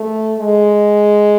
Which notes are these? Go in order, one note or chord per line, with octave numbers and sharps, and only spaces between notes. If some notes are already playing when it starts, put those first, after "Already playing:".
Already playing: A3
G#3